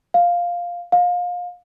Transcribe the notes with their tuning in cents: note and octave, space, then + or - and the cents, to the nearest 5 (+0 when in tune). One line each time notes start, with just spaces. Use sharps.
F5 +5
F5 +25